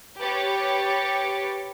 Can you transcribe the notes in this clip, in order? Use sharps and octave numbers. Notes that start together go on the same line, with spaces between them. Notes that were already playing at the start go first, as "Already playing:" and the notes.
G4 B4 C#5 D6 A6 C#7